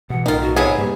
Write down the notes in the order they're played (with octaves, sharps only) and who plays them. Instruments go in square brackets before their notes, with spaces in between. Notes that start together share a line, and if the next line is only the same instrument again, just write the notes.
[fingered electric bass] B2 E3 [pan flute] F#5
[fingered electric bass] B1 A2 A3 [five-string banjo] D#3 [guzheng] D#4 F4 [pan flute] A#4
[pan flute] F#4
[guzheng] C3 B3 A5 [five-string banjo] G#4 [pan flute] C#5
[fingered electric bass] G2 A#3 [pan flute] G4